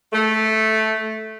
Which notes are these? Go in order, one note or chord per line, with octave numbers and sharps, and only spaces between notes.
A3